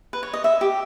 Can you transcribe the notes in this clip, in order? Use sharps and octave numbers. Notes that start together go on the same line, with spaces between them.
B4
C#5
D#5
E5
G4